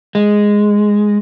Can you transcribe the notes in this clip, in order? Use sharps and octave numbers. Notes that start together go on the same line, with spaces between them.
G#3